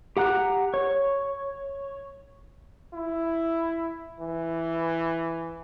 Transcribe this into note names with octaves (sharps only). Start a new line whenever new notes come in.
G4 F#5 A#5 F#6
C#5
E4
E3